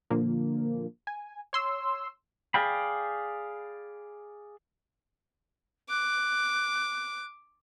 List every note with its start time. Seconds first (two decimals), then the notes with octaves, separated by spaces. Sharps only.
0.10 A#2 D3 F3 A#3
1.07 G#5
1.53 C#5 C6 E6
2.54 G#4 D5 F5 G5 B5
5.89 D6 F#6